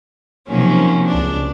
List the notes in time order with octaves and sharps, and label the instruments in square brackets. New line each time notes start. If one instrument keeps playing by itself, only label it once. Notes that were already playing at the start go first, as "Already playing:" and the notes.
[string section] C3 D#3 F3 F#3 A#3 C#4
C#2 D4